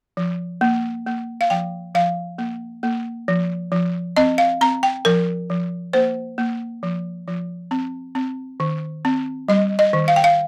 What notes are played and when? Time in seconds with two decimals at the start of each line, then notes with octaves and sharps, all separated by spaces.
0.17 F3
0.61 A#3
1.06 A#3
1.41 F5
1.50 F3 G5
1.95 F3 F5
2.38 A#3
2.83 A#3
3.28 F3
3.72 F3
4.17 C4 D#5
4.38 F5
4.61 C4 A#5
4.83 G5
5.05 F3 A#4
5.50 F3
5.93 A#3 C5
6.38 A#3
6.83 F3
7.28 F3
7.71 C4
8.15 C4
8.60 D#3
9.05 C4
9.48 G3 D#5
9.79 D#5
9.93 D#3
10.08 F5
10.16 G5
10.24 F5